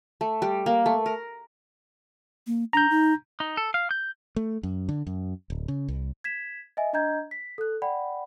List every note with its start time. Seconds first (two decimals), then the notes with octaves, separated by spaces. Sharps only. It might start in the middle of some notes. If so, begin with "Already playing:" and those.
0.21 A3
0.42 G3
0.66 A#3
0.86 A3
1.06 A#4
2.47 A#3
2.73 D4 A#5 G6
2.91 D#4
3.40 D#4
3.57 A4
3.74 F5
3.91 G6
4.36 A3
4.63 F#2
4.89 D3
5.07 F#2
5.50 D1
5.68 C#3
5.88 C2
6.24 G#6 B6 E7
6.77 D#5 E5 G#5
6.93 D4 D#5 A#5 G6 G#6
7.31 B6
7.58 A4 F#6
7.82 D5 F#5 G5 B5